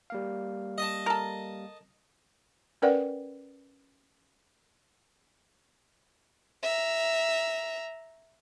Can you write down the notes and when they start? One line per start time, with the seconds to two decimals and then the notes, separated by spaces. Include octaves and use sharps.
0.10 G3 A#3 F5
0.78 D#5 A5
1.06 A4 A#4
2.82 C#4 A#4 B4 D5 F#5 G5
6.63 E5 A#5